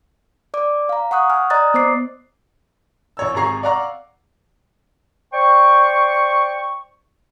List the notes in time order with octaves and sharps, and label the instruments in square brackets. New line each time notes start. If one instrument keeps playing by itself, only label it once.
[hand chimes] D5 D6
F5 A#5
F#5 C#6 D#6 F#6
G#5 F6
D5 D#5 A#5 D#6 F#6 A6
B3 C5 D6 C7
[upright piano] A1 C#5 E6
G#1 C3 G#4 A#5 C#6 C7
D5 F5 F#5 A#5 C#6
[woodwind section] C5 D5 G5 C#6